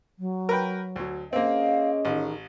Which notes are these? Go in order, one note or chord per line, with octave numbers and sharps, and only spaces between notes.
F#3
A#4 B4 G5
D2 F#3
A#3 C4 C#4 G#4 D#5 F5
A1 D#3